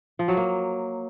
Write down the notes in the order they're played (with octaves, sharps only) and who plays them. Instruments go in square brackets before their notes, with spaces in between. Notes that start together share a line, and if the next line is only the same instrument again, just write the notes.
[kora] F3
F#3
A#3